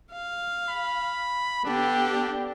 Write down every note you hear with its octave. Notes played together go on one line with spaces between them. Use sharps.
F5
B5
D3 B3 D4 G4